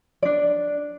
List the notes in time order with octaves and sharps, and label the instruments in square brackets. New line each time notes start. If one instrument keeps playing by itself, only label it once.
[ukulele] D4 D5